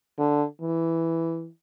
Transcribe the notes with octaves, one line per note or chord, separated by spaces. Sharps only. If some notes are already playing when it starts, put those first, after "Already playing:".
D3
E3